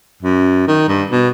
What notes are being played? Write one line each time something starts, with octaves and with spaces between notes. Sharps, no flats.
F#2
D#3
G2
B2